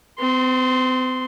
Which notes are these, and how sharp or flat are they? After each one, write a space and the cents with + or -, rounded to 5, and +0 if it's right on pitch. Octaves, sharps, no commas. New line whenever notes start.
C4 -40 C6 -5